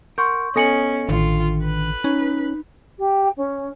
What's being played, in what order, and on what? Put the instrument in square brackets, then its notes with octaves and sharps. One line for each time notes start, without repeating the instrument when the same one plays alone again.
[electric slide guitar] A#4 F#5 [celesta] C6 C#6 G6
[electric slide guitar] B3 D#5 G#5 [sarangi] C#4 [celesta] A4 C#7 F#7
[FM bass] A1 [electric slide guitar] D3 D#3 [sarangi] F4
[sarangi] B4
[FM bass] C#4 [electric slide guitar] D#4
[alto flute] G4
C#4